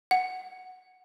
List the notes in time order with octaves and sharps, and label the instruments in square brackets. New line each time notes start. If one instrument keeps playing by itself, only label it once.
[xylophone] F#5